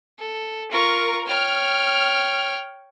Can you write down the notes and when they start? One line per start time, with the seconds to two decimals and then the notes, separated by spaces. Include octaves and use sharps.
0.19 A4
0.71 F4 A#4 C#6
1.28 C#5 G5 F6